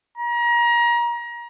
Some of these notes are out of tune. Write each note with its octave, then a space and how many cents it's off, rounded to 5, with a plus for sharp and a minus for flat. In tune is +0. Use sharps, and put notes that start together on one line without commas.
A#5 +30